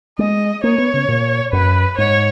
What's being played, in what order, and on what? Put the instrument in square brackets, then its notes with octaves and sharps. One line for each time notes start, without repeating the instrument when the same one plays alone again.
[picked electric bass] G#3 [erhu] D#5
[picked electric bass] A#3 [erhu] C#5
[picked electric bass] B3
C#3
A#2
[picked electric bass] F#2 [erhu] B4
[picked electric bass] G#2 [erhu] C#5